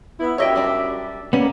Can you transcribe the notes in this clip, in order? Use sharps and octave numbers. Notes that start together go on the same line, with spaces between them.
B3 E4
F#2 G4 C#5 D#5 E5 G5
G3 D4
G3 A#3 B3 C#4